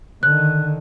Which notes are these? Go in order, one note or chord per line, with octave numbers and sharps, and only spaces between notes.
D3 D#3 F#6